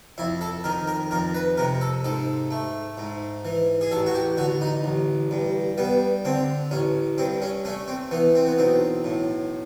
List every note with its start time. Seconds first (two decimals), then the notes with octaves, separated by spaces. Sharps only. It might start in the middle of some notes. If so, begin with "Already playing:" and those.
0.18 F2 E4
0.41 A4
0.64 D#3 A#4
0.87 A#4
1.11 F2 A#4
1.34 B4
1.57 C3 A#4
1.81 A4
2.04 G#2 A4
2.51 A3
2.97 G#2
3.45 E3
3.81 G#4
3.91 A1 A4
4.06 F#4
4.14 G4
4.37 D3 F#4
4.61 D#4
4.84 A1
5.31 G2
5.78 G3 B3
6.25 D3 C4
6.71 A1 C#4
7.18 G2 C4
7.42 C#4
7.65 A3 C#4
7.88 C4
8.11 E3 B3
8.35 C4
8.47 B3
8.58 B1 C4
9.04 A2